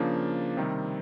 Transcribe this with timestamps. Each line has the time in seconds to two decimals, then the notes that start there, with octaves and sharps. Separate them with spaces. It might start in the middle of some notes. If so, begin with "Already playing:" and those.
Already playing: C#3 F3 A#3 D4
0.57 C3 D#3 G3 C4